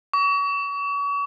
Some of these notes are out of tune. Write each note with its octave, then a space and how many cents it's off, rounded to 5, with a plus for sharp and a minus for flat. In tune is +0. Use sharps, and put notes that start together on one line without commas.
C#6 +40